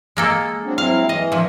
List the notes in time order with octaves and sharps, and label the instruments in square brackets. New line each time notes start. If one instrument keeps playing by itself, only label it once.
[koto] G#3 A#3 A4
[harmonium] F#3 C4 D4
[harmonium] F#3 C4 E4 [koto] F5
[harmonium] E3 [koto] D#5
[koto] A#2 F3